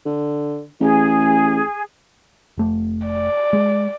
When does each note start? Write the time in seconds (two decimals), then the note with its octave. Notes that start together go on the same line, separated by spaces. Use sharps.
0.06 D3
0.81 A1 G#4
2.57 F1 A3
3.06 D5
3.53 G#3